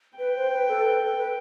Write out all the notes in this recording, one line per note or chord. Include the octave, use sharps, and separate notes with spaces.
B4 G5
C5
B4
A4
B4
A4
B4